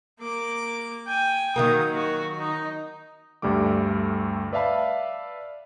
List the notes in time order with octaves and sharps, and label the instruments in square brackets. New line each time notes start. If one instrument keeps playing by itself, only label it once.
[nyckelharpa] A#3 D6
G5 G#5
[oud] D#3 F#3 A#3 [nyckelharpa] D#6
[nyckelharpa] F#4
D#4
[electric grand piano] D2 G2 G3 A3 D6
B4 D5 E5 F5 A5 B5